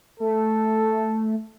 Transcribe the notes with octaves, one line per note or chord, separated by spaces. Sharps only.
A3 A4